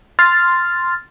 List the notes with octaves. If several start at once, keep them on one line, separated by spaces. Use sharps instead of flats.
C6 F6 A6